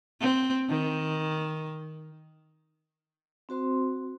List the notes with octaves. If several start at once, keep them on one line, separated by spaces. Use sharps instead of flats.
C4
D#3
C4 F#4 C5 C6